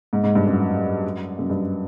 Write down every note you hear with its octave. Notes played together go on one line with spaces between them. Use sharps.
G#2
G#2
G2
F#2
F#2
G2